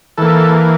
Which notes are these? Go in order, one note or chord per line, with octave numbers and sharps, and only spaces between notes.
E3 A#3 A4